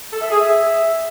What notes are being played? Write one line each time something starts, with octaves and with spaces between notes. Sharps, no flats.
A4
E5
G#4
E5